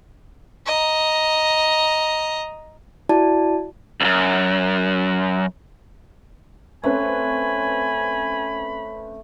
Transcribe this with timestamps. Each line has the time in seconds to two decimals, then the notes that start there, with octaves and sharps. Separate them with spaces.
0.66 D#5 A#5
3.09 E4 F#4 D5 A5
4.01 C#2 F#2
6.84 A3 C4 C#4 B4 G#5 B5